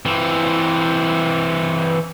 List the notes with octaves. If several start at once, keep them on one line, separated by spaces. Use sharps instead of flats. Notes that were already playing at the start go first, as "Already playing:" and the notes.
E3 C4